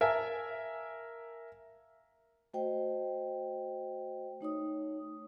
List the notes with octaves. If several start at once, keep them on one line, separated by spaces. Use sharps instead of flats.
A#4 E5 F5 G#5 A5
A3 F#4 C5 D#5 G5
A3 D#4 C#5 D#6